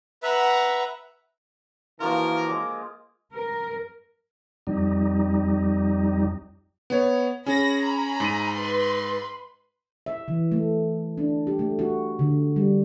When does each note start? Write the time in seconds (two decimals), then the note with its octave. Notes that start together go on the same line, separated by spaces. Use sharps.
0.23 B4 E5 F#5 A#5
2.00 E3 F3 A#3 F4 F#4 A#4
2.47 G#3 D6
3.33 A#4
4.67 F2 G3 D#4
6.90 B3 C#5
7.46 C#4 G#4 B5 A#6
7.81 G#5 A#5 B5
8.20 G#2 D#7
8.55 B4 B5 C6
10.06 E5
10.28 E3
10.52 A3
11.18 D4
11.47 G4
11.59 A3
11.79 F#4
12.19 D3
12.56 G3